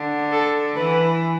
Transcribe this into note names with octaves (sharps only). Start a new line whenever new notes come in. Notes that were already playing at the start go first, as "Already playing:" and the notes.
Already playing: D3
A4
E3 B4